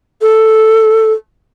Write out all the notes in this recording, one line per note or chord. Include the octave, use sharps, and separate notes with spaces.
A4